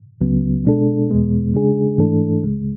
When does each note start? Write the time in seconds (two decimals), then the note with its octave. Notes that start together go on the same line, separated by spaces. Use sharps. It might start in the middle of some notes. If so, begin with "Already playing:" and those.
0.21 C#2 C#3 F#3 B3
0.65 B2 G#3 D4 A4
1.09 E2 B2 G#3 B3
1.54 C#3 G#3 D4 G#4
1.98 G#2 E3 A3 D4 A4
2.43 C#2 C#3 G#3